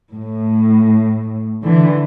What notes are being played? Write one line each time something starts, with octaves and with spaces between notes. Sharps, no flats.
A2
D3 E3